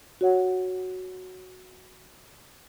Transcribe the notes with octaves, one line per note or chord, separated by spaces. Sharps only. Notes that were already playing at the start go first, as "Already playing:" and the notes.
F#4 C#5 F#5